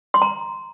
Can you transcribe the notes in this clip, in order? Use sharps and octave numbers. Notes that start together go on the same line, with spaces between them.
C6
A#5